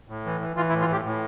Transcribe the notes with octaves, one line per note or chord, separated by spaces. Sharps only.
A2
E3
E3
E3 F4
E4
A2
F4
A2 G4
A2